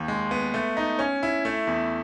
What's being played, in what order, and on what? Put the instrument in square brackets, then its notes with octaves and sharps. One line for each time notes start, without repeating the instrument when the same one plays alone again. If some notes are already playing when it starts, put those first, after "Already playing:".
Already playing: [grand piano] D#2
G#3
B3
A3
D#4
C#4
E4
A3
E2